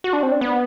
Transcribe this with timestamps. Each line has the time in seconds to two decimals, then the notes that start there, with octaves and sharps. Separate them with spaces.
0.04 F#4
0.13 D4
0.23 C4
0.32 D4
0.41 B3